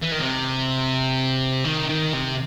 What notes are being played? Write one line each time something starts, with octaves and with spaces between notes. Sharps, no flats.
E3
D#3
C3
D#3
D#3
C3